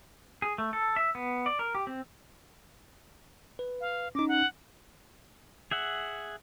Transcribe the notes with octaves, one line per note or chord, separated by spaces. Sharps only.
G#4
A3
A4
E5
B3
D5
A#4
G4
C4
B4
F5
C#4 D#4 D6
F#5
G#4 E5 F#5